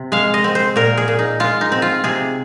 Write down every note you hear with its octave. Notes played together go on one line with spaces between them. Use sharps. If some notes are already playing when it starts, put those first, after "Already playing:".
Already playing: C3
G#3 F5
D#5
C4
C5
A#2 A#4
G#4
A#2
D#4
G#3 F4
D#4
C4
F4
C3 G#4